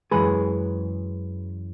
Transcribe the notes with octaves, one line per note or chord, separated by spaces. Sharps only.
F#2 E3 G#3 G#4 B4